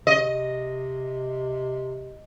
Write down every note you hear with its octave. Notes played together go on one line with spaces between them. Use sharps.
C3 D#5